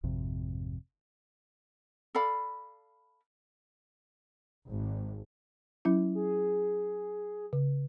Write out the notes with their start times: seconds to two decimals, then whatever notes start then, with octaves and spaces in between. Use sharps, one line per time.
0.03 G#1 F2 C3
2.15 A4 D5 F5 B5
4.68 G#1
5.85 F#3 C#4 E4
6.15 G#4
7.53 C#3